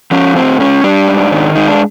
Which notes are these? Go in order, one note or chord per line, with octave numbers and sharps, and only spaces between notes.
F3 C#4
A2 C4
G#3 C#4
G3 D4
G#2
D#3
G#3 D#4
D4